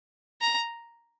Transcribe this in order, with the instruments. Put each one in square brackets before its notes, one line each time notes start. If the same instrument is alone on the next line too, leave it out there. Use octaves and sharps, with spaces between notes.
[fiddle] A#5